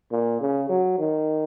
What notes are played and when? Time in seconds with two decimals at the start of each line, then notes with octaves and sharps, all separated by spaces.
0.12 A#2
0.41 C#3
0.69 F#3
0.98 D#3